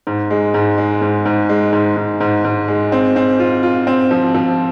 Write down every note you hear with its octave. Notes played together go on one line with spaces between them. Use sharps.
G#2
G#3
G#2
G#3
G#2
G#2
G#3
G#2
G#2
G#2
G#2
G#3
C4
C4
F4
F4
C4
F3
F3